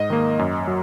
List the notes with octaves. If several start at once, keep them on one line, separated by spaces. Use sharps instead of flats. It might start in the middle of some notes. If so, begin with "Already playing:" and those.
Already playing: G#2 D#5
D#3 A#3
F#2
F#3